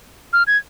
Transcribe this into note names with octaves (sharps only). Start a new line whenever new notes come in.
F6
G#6